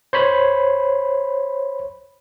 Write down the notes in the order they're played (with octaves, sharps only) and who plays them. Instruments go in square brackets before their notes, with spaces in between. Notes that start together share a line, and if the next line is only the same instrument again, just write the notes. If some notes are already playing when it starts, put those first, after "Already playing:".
[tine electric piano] C5 C#5 B5